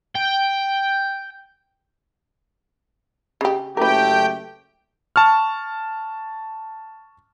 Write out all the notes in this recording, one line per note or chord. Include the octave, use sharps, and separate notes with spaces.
G5
C#3 G4
F#1 A3 G4 A#4 B4 G5
A5 C#6 F6